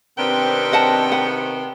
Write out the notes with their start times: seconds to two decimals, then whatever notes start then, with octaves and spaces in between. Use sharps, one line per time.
0.18 C3 D#3 B3 C4 D4 A#4 G5
0.72 D#5 F#5 A5
1.12 B4 F#5